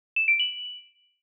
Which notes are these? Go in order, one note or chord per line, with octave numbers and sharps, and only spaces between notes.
E7
D7
F#7